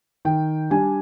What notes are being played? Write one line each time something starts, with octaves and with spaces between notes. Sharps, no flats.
D#3 G5
G3 D4 G#5